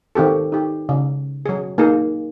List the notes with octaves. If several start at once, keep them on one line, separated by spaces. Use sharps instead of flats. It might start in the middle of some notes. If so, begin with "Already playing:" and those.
D#3 C4 G4 A4
D#4 G4
C#3
F#3 G#4
A#3 D#4 G#4